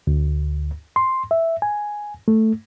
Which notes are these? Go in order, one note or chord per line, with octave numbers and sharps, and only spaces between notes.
D2
C6
E5
G#5
A3